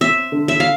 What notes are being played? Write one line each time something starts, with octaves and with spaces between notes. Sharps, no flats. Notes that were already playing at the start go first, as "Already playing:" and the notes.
C4 E5
D3
E5
F5